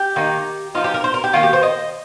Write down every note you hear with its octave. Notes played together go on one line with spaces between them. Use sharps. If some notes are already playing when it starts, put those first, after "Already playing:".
Already playing: G4
D#3 A#3 D#4
F3 D#4 F4
G4
A#4
C5
A#4
G4
D#3 G3 A#3 F4
G4
C5
D#5